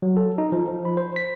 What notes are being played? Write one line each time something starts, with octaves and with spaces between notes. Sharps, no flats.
F#3
A4
D#4
F3
F3
B5
C5
B6